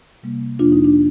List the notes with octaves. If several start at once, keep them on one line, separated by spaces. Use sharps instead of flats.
C3 G3 A#3
F2 C3 F3 A#3 D4 F4
D#4
D4